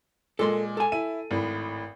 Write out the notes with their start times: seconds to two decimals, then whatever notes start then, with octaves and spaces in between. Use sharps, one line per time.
0.39 A#2 G#3 A4 C6
0.77 A4 G#5
0.92 E4 D#7
1.31 G#1 A2